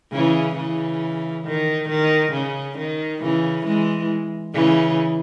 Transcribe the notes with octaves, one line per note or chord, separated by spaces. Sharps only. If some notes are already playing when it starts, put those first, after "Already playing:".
C#3 E3
C#3 E3
D#3
D#3
C#3
D#3
C#3 E3
E3 G#3
C#3 E3